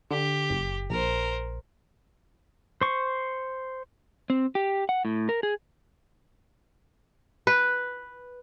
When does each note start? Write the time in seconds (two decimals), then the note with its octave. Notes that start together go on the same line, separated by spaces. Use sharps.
0.11 D3 G4
0.50 F#1
0.90 A#1 A#4 C5
2.81 C5 C#6
4.30 C4
4.55 G4
4.89 F#5
5.05 A2
5.29 A#4
5.43 G#4
7.47 B4